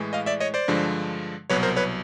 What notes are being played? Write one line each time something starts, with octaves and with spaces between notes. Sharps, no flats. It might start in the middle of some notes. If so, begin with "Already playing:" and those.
Already playing: A2 E3 G#3
D#5 F5
D5 E5
C#5 D#5
C5 D5
G2 D3 F3 G#3
C2 B2 F#3 B4 C#5
A#4 C5
B4 C#5